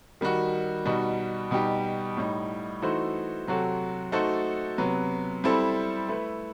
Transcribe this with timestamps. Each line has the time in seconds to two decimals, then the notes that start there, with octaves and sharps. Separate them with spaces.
0.21 D#3 G3 D#4 F#4
0.86 B2 G3 D#4 F#4
1.51 B2 G3 D#4 G4
2.17 A2 G3 D#4
2.82 E3 A3 D#4 F#4 C5
3.47 C3 F#3 C4 F#4 A4
4.12 A3 D#4 F#4 A4 C5
4.78 C3 F#3 B3
5.44 G3 C4 E4 A4 C5
6.08 A3 E4 B4